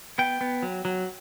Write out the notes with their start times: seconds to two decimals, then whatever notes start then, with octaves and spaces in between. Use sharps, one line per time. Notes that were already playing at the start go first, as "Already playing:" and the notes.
0.18 B3 G5
0.41 B3
0.63 F#3
0.85 F#3